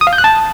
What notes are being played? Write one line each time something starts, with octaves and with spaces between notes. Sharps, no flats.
D#6
F5
G6
F#6
A5